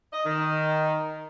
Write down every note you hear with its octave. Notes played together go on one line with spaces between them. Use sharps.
D#5
D#3